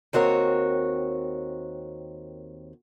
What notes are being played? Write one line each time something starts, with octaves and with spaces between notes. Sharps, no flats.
D#2 C4 F#4 A#4 C#5